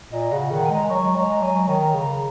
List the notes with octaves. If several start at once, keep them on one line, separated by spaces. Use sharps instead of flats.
A#2 D#5
C#3 F#5
D#3 F#5
G#5
G#3 A#5
F#3 C#6
G#3 A#5
F#3 G#5
D#3 A#5
C#3